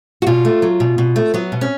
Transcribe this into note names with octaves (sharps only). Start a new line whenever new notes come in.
F#4
B2 F4
A3
F#3
B2
B2
A3
F#3 B3
B2
C#4